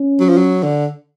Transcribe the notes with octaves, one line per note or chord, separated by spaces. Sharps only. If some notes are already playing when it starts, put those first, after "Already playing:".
Already playing: C#4
F#3
F3
F#3
D3